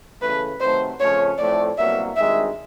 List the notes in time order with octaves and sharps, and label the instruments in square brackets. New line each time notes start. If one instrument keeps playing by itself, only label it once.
[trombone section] C#3 E3 A3 [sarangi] B4
[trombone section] C3 D#3 F#3 A3 [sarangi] C5
[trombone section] F2 C#3 F3 A3 C#4 [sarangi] C#5
[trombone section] A2 F3 A3 C4 [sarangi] D5
[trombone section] C2 B2 F#3 A#3 [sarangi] E5
[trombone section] G#1 G2 D#3 G#3 [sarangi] E5